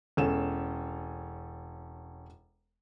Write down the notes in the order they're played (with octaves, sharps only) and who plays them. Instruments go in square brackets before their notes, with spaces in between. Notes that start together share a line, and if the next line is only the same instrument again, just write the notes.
[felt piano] E1 C#4 A4 E7